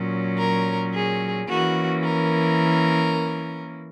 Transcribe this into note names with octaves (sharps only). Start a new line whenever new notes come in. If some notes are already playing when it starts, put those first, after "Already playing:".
Already playing: A#2 F#3 C#4
A#4
G#4
E3 A#3 C#4 F#4
A#4